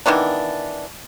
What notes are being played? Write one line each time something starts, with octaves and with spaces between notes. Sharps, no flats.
D#3 E3 B3 D4